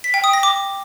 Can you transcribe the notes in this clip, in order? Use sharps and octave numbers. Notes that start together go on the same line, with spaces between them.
B6
G5
D#6
A#6
D6